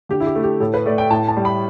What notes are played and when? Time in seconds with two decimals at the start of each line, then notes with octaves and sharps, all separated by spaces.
0.09 D3 G4
0.20 E4
0.27 G4
0.36 A3
0.44 G4
0.60 A2 A4
0.74 B4
0.86 A3 D5
0.98 G5
1.11 A2 A5
1.28 A5
1.37 G3
1.45 B5